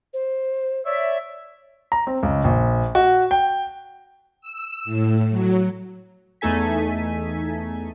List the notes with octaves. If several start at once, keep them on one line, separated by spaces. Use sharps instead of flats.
C5
C#5 D5 E5
A#5
C4
C#2
A#1
F#4
G5
E6
A2
F#3
E2 A3 D#4 A4 G#5 B6